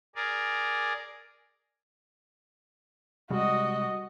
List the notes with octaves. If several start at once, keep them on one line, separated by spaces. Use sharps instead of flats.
G#4 A#4 D5
C3 G3 G#3 F#4 D#5